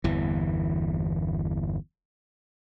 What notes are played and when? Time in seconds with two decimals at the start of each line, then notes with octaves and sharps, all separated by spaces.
0.04 G1 E2 E3